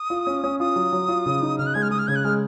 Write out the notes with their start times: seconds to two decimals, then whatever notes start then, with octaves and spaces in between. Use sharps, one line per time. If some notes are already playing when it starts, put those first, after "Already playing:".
Already playing: D#6
0.10 F4
0.27 C#4
0.44 C#4
0.60 F4 D#6
0.76 F#3
0.93 F#3
1.08 F4
1.26 C#3
1.42 D#4
1.58 C#3 F6
1.66 F#6
1.74 G#3 G#6
1.83 F6
1.91 G#3 D#6
1.99 F6
2.08 C#3 G#6
2.16 F#6
2.24 G#3 F6